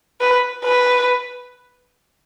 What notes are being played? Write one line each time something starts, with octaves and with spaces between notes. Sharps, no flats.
B4
B4